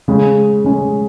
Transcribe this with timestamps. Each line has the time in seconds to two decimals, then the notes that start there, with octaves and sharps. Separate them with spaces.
0.08 C#3 G#3 C#4
0.64 C#3 G#3 C#4